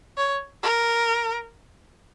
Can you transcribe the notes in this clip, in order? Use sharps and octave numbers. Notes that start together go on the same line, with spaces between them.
C#5
A#4